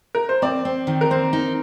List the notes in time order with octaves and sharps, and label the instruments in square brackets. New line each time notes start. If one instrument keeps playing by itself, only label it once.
[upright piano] A#4
C5
[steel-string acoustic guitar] C4 [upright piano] D5
[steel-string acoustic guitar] C4
D#3
[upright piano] A#4
[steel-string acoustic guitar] C4 [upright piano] C5
[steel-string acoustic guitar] D#4